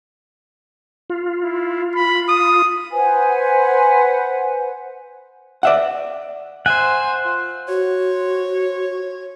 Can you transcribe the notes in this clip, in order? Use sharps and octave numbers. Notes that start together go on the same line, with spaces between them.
F4
E4
B5
D#6
B4 C5 F#5 G#5
D5 E5 F#5
C5 E5 F#5 G#5
F4
F#4 C#5